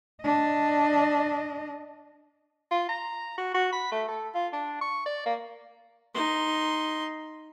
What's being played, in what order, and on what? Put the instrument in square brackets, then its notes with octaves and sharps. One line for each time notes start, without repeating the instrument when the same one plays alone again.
[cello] D4 D#5
[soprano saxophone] F4
A#5
F#4
F#4
B5
A3
A4
F4
D4
C#6
D5
A#3
[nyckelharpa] D#4 C6